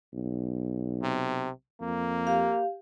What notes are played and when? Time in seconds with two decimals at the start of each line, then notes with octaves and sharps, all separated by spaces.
0.13 B1
1.03 C3
1.81 F2 A#3
2.27 G4 F5